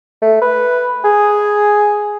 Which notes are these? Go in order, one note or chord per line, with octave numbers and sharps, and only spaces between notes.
A3
B4
G#4